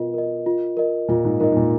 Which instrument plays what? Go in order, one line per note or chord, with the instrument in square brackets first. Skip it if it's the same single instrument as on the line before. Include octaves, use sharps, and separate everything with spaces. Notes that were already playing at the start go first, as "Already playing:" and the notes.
Already playing: [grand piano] B2 [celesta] F4 A#4 D#5
[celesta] A#4 D#5
F4
A#4 D#5
[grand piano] A#2 [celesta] F4
[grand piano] G#2
[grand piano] G#2 [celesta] A#4
[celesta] D#5
[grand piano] G#2
A#2